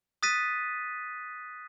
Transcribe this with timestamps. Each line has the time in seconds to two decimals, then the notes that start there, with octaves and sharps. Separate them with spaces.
0.23 D#6 F#6 A6 B6 D#7